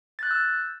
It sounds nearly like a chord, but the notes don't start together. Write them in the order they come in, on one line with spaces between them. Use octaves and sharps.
A6 F#6 G6 E6